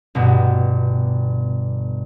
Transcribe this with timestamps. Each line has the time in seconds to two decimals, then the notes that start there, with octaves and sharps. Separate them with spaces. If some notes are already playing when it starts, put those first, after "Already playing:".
0.15 G1 B2